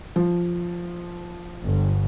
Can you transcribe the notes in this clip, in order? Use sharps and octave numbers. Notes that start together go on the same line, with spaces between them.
F3
G1